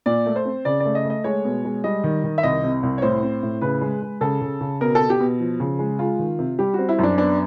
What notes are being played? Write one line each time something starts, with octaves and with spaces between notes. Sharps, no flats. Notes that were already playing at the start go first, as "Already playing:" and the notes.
A#2 D5
A3
C5
C4
C#3 D5
A3 D5
D#5
A3
D#5
G#3 C#5
B2
G#3
G3 D#5
D#3
D#3
E5
C2 D#5
C3
C2
C#5
A2 C5
C4
A2
C#3 B4
G#3
G#3
C#3 A4
C#3
C#3
B2 A#4
A4
B2
G4
B2
F3
C#3
G#3
G#3 F4
D#3
C3
G3 G4
C4 F#4
E4
F#2 D4
B3 D4